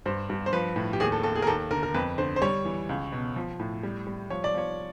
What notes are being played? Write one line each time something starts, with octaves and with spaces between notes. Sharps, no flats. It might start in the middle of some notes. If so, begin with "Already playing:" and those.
G2 C5
G2
C5
F3 B4
A2
G4
D#2 G#4
A4
D#2 A4
G#4
A#4
D#2 A4
D3 A#4
A#4
F2 B4
D3 C5
C5
G3 C#5
E3
C#2
B2
F3
A2
G3
G3
F3 C#5
D5
F3 C#5